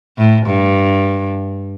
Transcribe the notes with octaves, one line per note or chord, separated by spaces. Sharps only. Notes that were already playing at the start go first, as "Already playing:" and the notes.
A2
G2